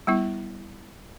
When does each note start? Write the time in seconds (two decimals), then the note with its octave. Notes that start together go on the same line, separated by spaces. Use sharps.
0.07 G3 B3 E4